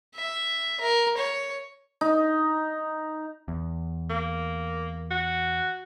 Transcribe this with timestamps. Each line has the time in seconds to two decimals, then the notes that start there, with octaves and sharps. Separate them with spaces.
0.16 E5
0.80 A#4
1.17 C#5
2.01 D#4
3.48 E2
4.10 A#3
5.11 F#4